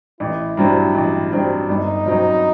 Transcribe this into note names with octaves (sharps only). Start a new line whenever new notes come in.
A1 E4
G2 F#3 C4
A1
G2 F#3 C4
G1 D#4
F#2 F#3 C4